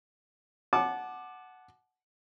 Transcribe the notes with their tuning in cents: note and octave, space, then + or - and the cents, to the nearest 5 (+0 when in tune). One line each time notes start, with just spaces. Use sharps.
F#5 +0 A5 -30 D6 +15